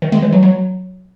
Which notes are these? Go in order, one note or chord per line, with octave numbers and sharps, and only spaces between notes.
D#3
G#3
E3
F#3
F#3